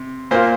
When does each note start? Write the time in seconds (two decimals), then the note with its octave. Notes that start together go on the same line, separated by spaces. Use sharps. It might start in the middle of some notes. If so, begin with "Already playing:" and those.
Already playing: C3
0.31 A#2 A#3 F4 C5